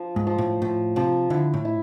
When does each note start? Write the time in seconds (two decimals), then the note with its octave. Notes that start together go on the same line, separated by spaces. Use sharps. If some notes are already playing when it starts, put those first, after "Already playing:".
Already playing: F3
0.16 G#2
0.27 F3
0.38 A2
0.62 A2 F3
0.96 C3 F3
1.30 D3 E4
1.54 A2
1.65 E4